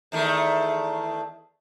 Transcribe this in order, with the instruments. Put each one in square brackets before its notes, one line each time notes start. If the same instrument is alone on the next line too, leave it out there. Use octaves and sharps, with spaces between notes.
[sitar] E2 D#3 A3